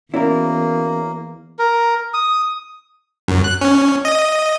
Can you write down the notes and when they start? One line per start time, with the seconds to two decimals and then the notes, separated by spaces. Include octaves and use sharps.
0.14 E2 A#3 C#4 E4 F#4 A#4 D5
1.59 A#4
2.14 D#6
3.28 F#2
3.44 F#6
3.61 C#4
4.05 D#5